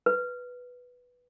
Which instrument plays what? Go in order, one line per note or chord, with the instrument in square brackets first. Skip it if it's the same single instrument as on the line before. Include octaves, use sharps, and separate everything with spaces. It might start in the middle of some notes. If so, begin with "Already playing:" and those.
[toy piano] B4